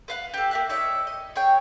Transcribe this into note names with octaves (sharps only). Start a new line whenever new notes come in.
B4 F5 F#5
G4 A4
A#3 E5 F#6
D#4 C#5 D5 E5
D#5
G#4 C#5 G5